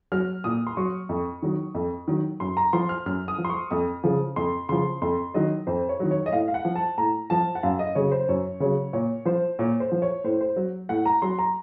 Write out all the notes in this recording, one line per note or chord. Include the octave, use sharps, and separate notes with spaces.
F#3 F6
A#2 D#6
C6
F#3 C#6
F2
D#3 F#3
F2
D#3 F#3
F#2 C6
A#5
F3 C6
F6
F#2 F6
D#6
F3
C6
C#6
F2 D#6
C#3 F3
F2 C6
C#3 F3 C6
F2 C6
D#3 F#3 D#5
F2 C5
C#5
D#3 F#3
C#5
D#5
A2 F5
F5
F#5
F3
A5
A2 A#5
F3 A5
F#5
F#2 F5
D#5
C#3 F#3 C#5
C5
F#2 C#5
C#3 F#3 C#5
A#2 C#5
F3 C5
A#2 C#5
C5
F3
C#5
A2 C5
C5
F#3
A2 F#5
A#5
F#3 C6
A#5